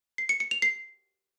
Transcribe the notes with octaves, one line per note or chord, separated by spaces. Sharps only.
C7
C#7
C#7
F7
C7